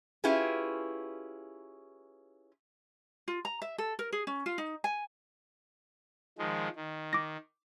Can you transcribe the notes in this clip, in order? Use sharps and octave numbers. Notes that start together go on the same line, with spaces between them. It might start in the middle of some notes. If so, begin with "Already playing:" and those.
C#4 E4 F4 G4 G#4 B4
F4
A#5
E5
A4
A#4
G#4
C#4
F4
D#4
G#5
D#3 F3 G#3
D#3
D6 A#6